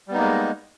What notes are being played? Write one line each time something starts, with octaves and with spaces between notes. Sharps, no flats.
G3 G#3 A#3 B3 D#4